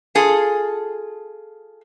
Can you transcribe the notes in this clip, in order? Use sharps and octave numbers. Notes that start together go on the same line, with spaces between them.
F4 G#4 A4